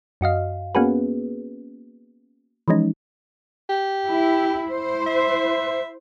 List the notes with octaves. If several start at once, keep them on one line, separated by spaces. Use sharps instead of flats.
F#2 F#4 D#5 F5
A#3 B3 C#4 F#4 G#4 B4
E3 F3 G#3 C#4 D#4
G4
E4
E4 C5
E5